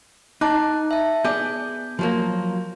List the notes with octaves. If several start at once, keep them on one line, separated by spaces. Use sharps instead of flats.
D#4 A5 D6 F#6
E5 A5
B3 G#4 D5 G6
F3 F#3 A#3